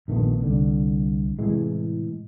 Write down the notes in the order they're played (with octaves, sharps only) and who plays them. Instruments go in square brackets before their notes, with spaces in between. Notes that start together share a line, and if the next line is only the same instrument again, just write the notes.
[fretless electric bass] A#1 D#3 A3 B3
C2 D3
A2 C3 E3 G#3